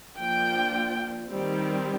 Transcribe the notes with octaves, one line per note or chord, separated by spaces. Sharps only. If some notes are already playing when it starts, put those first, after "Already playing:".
F3 A#3 D4 F4 G5
D#3 G3 C4